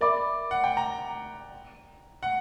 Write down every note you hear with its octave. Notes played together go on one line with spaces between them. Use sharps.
A#4 D5 E5 B5 D6
F#5
G5
A#5
F#5